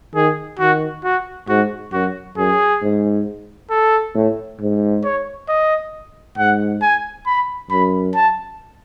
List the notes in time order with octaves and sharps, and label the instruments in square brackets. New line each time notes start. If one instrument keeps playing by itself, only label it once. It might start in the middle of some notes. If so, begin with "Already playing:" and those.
[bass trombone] D#3 [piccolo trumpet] G#4
[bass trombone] D#3 [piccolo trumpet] F#4
[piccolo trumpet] F#4
[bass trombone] G#2 [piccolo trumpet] F#4
[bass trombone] F#2 [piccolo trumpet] F#4
[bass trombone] F#2 [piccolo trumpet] G#4
[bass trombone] G#2
[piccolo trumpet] A4
[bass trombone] A2
G#2
[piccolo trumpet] C#5
D#5
[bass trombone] G#2 [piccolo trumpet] F#5
[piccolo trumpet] G#5
B5
[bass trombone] F#2 [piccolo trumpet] B5
[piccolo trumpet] A5